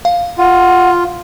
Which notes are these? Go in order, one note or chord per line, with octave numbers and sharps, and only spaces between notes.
F5
F4 F#5